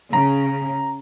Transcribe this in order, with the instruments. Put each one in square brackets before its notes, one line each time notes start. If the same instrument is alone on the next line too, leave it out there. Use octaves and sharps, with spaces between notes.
[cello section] C#3 [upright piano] A#5